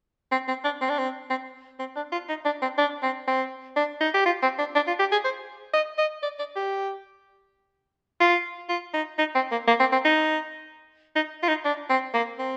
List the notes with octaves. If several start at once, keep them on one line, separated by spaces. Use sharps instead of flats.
C4
C4
D4
C4
D4
C4
C4
C4
D4
F4
D#4
D4
C4
D4
C4
C4
D4
D#4
G4
F4
C4
D4
D4
F4
G4
G#4
C5
D#5
D#5
D5
D5
G4
F4
F4
D#4
D#4
C4
A#3
A#3
C4
C4
D#4
D#4
F4
D#4
D4
C4
A#3
C4